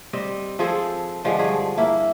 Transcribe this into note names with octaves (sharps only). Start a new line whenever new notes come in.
G3 C4 D#5
F3 C4 G#4 A4
D3 F3 G3 G#3
G2 F3 G#4
A#3 E4